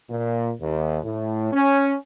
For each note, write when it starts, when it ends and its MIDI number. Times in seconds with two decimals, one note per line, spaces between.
0.10 0.51 46
0.60 0.98 39
1.04 1.50 45
1.53 1.95 61